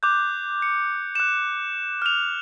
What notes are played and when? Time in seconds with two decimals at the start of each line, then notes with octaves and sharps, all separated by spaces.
0.03 D6 F#6 G6
0.62 C#7
1.15 F#6 E7
2.02 F6 F7